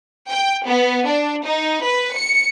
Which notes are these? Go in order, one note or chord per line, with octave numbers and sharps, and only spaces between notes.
G5
B3
D4
D#4
B4
C#7